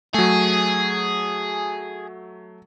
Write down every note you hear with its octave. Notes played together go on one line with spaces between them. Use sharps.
F#3 A3 G#4